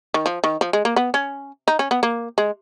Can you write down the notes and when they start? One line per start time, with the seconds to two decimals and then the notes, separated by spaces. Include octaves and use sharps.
0.14 D#3
0.26 F3
0.44 D#3
0.61 F3
0.73 G#3
0.85 A#3
0.96 B3
1.14 C#4
1.68 D#4
1.79 C#4
1.91 B3
2.03 A#3
2.38 G#3